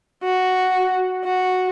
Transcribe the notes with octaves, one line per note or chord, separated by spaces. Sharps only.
F#4
F#4